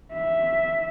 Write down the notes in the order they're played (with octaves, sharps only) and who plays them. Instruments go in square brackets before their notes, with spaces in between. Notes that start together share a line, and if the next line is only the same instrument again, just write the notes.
[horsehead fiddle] E5